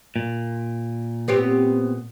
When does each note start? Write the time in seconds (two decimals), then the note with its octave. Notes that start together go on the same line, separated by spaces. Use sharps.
0.16 A#2
1.28 B3 C4 G4